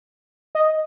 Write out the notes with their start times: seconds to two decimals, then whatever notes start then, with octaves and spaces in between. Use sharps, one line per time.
0.55 D#5